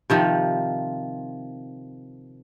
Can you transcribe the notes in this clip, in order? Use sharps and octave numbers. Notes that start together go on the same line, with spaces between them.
C3 D#3 F3